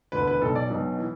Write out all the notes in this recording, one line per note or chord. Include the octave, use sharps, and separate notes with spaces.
E1 D2 D3 B4
B4
B1 B2 F#3 A4
D5
B1 B2 F#3
E3